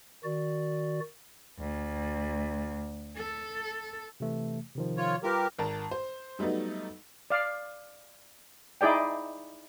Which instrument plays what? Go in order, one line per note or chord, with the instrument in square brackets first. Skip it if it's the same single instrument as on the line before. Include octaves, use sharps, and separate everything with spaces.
[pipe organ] D#3 F#4 D5
[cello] D2
A4
[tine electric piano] C3 E3 A3
C3 D#3 F3
[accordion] F4 C#5
[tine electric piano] G3 F4 B4 [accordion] G4 A#4
[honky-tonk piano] G#1 A#4 A5
C5
F#3 G3 A3 B3 D#4
[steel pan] D5 F5
D#4 E4 G#4 D5 G5